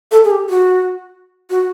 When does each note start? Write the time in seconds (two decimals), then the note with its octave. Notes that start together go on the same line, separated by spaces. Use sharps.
0.11 A4
0.25 G#4
0.31 G4
0.50 F#4
1.50 F#4